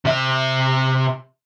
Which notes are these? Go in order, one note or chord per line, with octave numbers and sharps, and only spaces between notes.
C3 E5